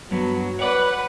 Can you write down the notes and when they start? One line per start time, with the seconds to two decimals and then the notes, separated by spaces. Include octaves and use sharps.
0.11 G2 F#3 B3
0.59 B4 C#5 D5 F#5